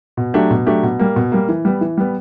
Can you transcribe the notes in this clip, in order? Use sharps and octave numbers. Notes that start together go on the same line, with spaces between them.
B2
F#3 A3 D4 G4
B2
F#3 A3 D4 G4
B2
G3 A#3
B2
G3 A#3
E3
G3 B3
E3
G3 B3